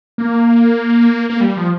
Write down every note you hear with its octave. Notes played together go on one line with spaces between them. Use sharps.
A#3
A#3
G3
F3